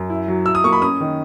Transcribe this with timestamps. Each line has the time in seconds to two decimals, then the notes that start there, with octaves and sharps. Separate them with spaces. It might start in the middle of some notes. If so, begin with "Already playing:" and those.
Already playing: F#2
0.10 E4
0.28 F#3
0.46 E4 E6
0.55 D#6
0.64 A#3 C#6
0.73 B5
0.82 C#4 D#6
1.01 D#3